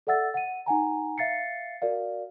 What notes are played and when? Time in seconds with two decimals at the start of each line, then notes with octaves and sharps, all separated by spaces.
0.07 A4 D5 E5 F#5 E6 A6
0.34 F#5 D#7
0.66 D#4 F#5 G#5 A#5
1.18 E5 F5 A6 C7 C#7
1.82 F#4 A#4 D5 F5